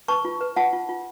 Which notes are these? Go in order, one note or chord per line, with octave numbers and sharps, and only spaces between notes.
B4 A5 C#6
F4
B4
F4 F#5 A5
F4
F4